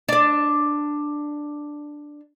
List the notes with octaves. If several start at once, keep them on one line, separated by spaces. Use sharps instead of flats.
D4 D5